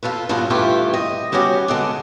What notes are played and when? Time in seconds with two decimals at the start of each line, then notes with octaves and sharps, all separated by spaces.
0.03 F2 F4 A4 B4
0.29 G2 A#2 C#3 E3 B3 F4
0.50 G2 E3 A3 E4 F4 G4
0.94 D#5
1.32 G3 B3 C#4 F#4 G4
1.68 D3 G#3 B3